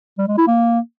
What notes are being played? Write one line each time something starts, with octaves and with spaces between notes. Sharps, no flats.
G3
G#3
E4
A#3